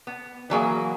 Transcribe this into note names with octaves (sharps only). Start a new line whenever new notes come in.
B3
E3 F#3 A#3 G#4